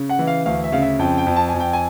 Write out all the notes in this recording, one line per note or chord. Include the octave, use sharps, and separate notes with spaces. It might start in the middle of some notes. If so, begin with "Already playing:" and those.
Already playing: C#3
F#5
E3
F5
D2 F5
E5
C#3 F5
E5
F2 G5
G5
F2
A5
G#5
F2
G5
G#5